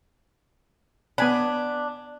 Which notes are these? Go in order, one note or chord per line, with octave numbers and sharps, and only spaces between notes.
B3 D4 G#5 B5